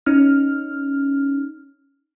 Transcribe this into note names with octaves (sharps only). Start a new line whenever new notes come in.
C#4 D#4 F6